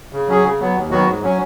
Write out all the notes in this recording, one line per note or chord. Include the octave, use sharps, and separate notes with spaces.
C#3
F#3 C#4 G#4
C#3
F#3 B3
D#2
D#3 F#3 B3 F#4
G#2
F#3 C#4